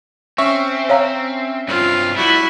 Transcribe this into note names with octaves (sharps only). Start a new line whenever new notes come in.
C4 C#4 E5 C#6
C#5 F5 A#5
G2 F#3 C4 F4
G3 A3 E4 F#4